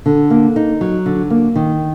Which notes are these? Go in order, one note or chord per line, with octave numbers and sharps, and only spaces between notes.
D3
A#3
D#4
F#3
D3
A#3
D#3